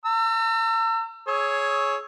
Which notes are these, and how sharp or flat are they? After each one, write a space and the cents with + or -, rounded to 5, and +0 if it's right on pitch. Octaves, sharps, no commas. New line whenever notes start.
A#5 -45 E6 +30
G#4 +15 C#5 +0 E6 +0